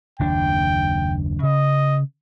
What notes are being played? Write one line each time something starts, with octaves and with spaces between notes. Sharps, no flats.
F#1 D#2 D4 G5
C#3 D#5